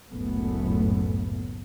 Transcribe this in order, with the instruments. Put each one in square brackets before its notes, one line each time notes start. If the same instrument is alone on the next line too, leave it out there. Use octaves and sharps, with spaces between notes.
[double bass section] F#1 C#2 F#2 A2 A3 B3